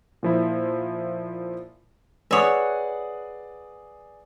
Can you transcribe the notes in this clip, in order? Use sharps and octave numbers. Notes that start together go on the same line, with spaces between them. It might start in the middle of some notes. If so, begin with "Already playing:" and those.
A#2 F3 E4
G#4 B4 C#5 D5 E5 F#5 D#6